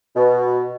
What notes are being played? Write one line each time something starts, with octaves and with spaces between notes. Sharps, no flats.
B2